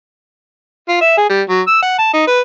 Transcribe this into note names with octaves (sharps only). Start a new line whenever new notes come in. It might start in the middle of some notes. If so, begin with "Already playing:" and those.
F4
E5
G#4
G3
F#3
E6
F#5
A5
D#4
B4